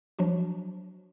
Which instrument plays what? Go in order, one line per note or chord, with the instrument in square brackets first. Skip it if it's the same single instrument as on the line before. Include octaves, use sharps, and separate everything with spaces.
[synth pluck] F3 F#3 D4 F#4